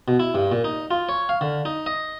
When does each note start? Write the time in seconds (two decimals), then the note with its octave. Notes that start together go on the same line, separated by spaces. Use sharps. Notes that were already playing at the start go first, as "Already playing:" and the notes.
0.08 B2
0.20 E4
0.35 G2
0.52 A#2
0.64 D#4
0.91 F4
1.09 C#5
1.29 F5
1.41 D3
1.65 D#4
1.86 D#5